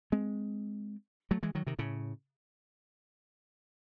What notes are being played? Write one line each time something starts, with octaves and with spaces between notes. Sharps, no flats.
G#3 C4
F#3 A3
E3 G#3
D#3 F#3
C3 D#3
A2 C#3